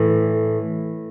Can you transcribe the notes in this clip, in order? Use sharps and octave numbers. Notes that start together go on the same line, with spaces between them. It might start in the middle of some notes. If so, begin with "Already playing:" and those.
Already playing: A2 E3